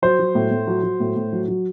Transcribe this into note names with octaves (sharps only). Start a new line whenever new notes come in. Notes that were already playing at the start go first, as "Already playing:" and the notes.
F#3 C5
F#3
A2
A2
F#3
F#3
A2
A2
F#3
F#3